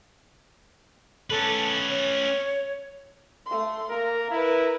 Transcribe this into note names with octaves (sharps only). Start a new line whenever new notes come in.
C#4 A4 B4
C#5
A3 C6
A#3 A#4
E4 A#4 B4